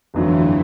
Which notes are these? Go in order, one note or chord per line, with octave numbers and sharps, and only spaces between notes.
G1 F2 D3 E3 F#3 A3